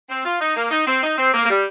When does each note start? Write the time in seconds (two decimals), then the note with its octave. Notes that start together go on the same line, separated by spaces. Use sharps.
0.09 C4
0.24 F4
0.40 D#4
0.56 A#3
0.71 D#4
0.87 C4
1.03 D#4
1.18 C4
1.34 A#3
1.45 A#3
1.50 G3